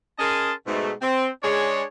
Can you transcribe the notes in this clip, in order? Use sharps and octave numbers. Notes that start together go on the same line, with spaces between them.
C#4 G#4 A#4 D#5 A5 C6
G#2 B2 A3
C4
G#3 D4 G#4 C#5